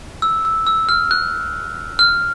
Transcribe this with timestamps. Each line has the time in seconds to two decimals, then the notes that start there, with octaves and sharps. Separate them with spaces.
0.22 E6
0.45 E6
0.67 E6
0.89 F6
1.11 F#6
1.99 F6